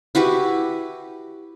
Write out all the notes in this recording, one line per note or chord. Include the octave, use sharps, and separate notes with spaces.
E4 F#4 G4 B4